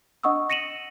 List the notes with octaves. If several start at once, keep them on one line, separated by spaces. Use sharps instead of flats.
D4 D#5 F#5 C#6 D#6 E6
A#6 C#7 D#7 E7 F#7